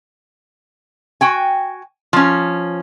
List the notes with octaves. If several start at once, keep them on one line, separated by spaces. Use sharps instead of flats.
F#4 G5 G#5
F3 C#4